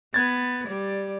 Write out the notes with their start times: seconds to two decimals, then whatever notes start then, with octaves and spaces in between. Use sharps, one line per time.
0.14 B3 B4 G#6 A6
0.68 G3 D5